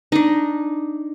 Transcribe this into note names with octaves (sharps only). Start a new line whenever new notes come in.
D4 D#4